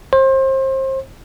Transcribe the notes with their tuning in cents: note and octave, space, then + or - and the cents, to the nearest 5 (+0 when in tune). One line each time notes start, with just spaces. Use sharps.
C5 +30